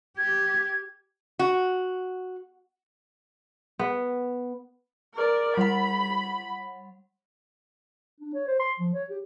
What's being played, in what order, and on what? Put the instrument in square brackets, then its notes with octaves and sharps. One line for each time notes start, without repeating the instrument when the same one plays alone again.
[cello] G4 [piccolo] G#6
[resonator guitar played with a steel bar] F#4
[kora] B3
[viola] A#4 D5
[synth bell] G3 F#5 [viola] B5
[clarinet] D4
C#5
C5
C6
F3
C#5
G4